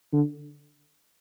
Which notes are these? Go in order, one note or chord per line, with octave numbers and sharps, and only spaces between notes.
D3